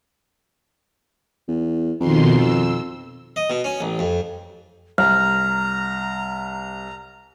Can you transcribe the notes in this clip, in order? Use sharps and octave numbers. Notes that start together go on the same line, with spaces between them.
E2
F2 B2 D#3 C6
E6
D#5
B2
C#4
A1
F2
C2 A#5 F6